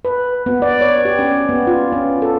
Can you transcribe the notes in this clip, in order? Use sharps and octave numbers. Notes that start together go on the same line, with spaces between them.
B4
B3
D5
C#5
G4
C#4
B3
F4
C#4
A4